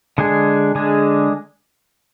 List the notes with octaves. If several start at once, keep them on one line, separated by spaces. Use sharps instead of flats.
D3 G#3 D4 G#4
D3 G#3 D4 G#4